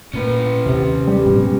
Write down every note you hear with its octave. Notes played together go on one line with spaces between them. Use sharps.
A#2 A#3 C#4 B4
D#2 C3
G3
G#2 B2 F#3